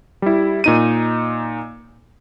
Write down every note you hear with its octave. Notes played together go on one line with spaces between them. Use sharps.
G3 E4
A#2 D#4 D#7